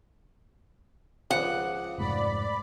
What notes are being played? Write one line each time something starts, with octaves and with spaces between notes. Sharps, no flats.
C#2 F3 F#5
F1 G#2 D5 B5